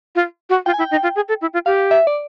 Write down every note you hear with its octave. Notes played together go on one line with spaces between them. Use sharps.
F4
F#4
F4 G5
G#5
E4 G5
D#4
F4
G#4
A4
E4
F4
G4 F5
E5
D5